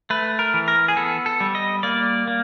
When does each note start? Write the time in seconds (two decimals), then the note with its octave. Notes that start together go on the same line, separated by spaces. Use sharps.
0.10 A3 B4
0.39 A#4
0.54 E3
0.68 A#4
0.88 G#4
0.97 B3 A4
1.26 A4
1.40 G3
1.55 D#5
1.83 A#3 D5
2.28 A#3